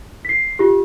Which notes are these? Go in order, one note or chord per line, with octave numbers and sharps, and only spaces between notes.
B6 C7
F4 G4